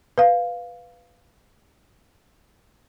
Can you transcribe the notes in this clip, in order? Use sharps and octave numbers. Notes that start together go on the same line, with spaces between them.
B4 F5